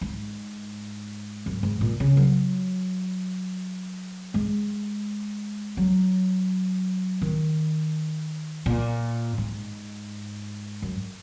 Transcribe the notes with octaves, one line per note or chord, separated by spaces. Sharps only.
G#2
F#2
G#2
A#2
C#3
F#3
G#3
F#3
D#3
A#2
G#2
F#2